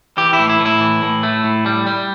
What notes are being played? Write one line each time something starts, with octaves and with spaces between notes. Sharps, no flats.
E3 G4
E4
A2
E4
A2
E4
E3
A2
A3
A2
G3
G3